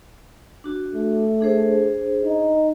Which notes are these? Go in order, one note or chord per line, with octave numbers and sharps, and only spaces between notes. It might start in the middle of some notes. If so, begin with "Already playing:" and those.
D4 F#4
A3
D4 G#4 C5
D#4